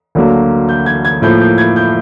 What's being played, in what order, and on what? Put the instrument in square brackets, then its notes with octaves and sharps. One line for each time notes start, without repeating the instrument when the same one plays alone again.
[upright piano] D2 D3 F#3 A#3
G6
G#6
G#6
A2 F3 A#3 G6
G6
G#6
G6